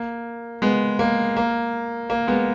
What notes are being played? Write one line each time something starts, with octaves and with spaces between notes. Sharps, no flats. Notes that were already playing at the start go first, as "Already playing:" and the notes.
Already playing: A#3
G#3 B3
A#3
A#3
A#3
G#3 B3